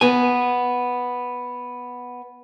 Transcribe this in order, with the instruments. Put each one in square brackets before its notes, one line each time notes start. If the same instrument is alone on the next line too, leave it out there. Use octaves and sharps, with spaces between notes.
[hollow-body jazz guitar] B3 G#5